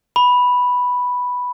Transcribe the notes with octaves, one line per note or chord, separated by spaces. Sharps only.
B5